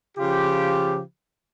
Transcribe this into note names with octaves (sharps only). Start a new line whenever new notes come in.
C#3 F3 F4 G4